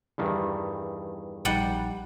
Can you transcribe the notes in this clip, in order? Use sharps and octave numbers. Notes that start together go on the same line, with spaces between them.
E2 G2 D#3
A#1 G3 D#4 F#5 G5